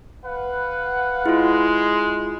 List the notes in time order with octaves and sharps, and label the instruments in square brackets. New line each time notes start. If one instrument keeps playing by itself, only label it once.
[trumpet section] B4 F5 F#5
[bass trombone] G#3 [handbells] E4 F4